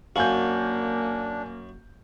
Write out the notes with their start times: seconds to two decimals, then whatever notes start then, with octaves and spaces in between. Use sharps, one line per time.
0.16 F#2 A#3 D4 F#4 F5 G#5 G6